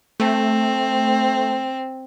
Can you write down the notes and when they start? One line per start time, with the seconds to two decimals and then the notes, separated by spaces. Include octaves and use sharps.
0.20 A3 C4